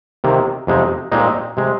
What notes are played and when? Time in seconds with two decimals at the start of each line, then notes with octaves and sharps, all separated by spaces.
0.24 C3 D#3 A#3
0.67 F2 C3 G#3 D#4
1.12 A#2 G#3 C4 D#4
1.57 C3 G#3